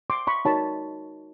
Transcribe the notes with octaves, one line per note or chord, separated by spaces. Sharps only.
C6 D6
B5 C#6
D#4 F#4 A#4 C#5 A5 B5